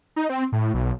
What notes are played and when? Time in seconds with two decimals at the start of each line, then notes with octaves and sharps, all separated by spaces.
0.16 D#4
0.30 C4
0.52 A2
0.74 B1